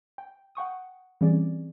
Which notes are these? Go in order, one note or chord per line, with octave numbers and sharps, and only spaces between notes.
G5
F#5 G5 C#6 D#6
E3 G3 C4 C#4 G#4 D5